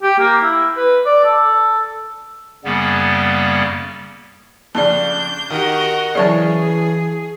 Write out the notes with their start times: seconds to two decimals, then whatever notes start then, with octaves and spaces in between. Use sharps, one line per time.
0.03 G4
0.20 A#3
0.43 E4
0.77 B4
1.06 D5
1.24 A4
2.65 F#2 C#3 G3 A#3 B3
4.75 F2 C#3 D4 D5 A5 G6
5.50 D#3 F#4 G4 A#4 D#5
6.15 C#3 E3 F#3 G#4 C#5 D5 A5